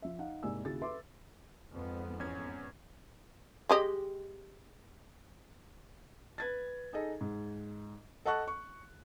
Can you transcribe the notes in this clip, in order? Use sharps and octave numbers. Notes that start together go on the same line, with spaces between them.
F3 E5
D#4 F5 F#5
C2 G#2 A#3 D5 G#5 E6
D#2 C#3 E4 F#4 G#4 A6
A4 B4 E5 C6 D6
F2 G#2 B3
E2 C#4 G#6
G#3 G4 D#5
B4 G#6 A6
D#4 G#4 A4 D#5
G#2
A4 D#5 F#5 A5 C#6 F#6
C#6